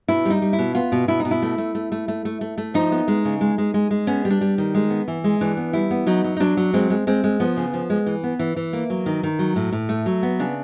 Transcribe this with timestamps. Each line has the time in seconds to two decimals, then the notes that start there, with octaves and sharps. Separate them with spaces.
0.08 B2 E4
0.25 G3 D#4
0.42 G3
0.53 E4
0.59 B2
0.75 B3 F4
0.92 B2
1.08 B2 E4
1.20 D#4
1.25 B2
1.31 E4
1.42 A3
1.58 A3
1.75 A3
1.92 A3
2.08 A3
2.25 A3
2.41 A3
2.58 A3
2.74 F3 D#4
2.92 B3
3.08 G#3
3.25 C#3
3.41 G#3
3.58 G#3
3.74 G#3
3.91 G#3
4.07 B3 C#4
4.25 G3
4.30 D4
4.41 G3
4.58 D#3
4.75 G#3
4.90 B3
5.08 E3
5.24 G#3
5.41 E3 D4
5.57 B3
5.73 G3 E4
5.91 B3
6.07 F#3 D#4
6.24 F#3
6.37 D#4
6.40 F#3 D4
6.57 F#3
6.74 G#3 C4
6.90 G#3
7.07 G#3 C4
7.24 G#3
7.40 F3 B3
7.57 C#3
7.73 F3
7.90 G#3
8.06 E3
8.24 B3
8.39 E3
8.56 E3
8.73 A#3
8.90 F#3
9.06 D#3
9.23 D#3
9.39 F#3
9.56 A2
9.73 A2
9.89 A3
10.06 F#3
10.23 B3
10.39 C#3 D4